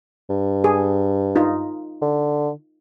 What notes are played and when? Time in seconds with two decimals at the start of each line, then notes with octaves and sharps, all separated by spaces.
0.30 G2
0.64 G#4
1.36 D#4 F4
2.02 D3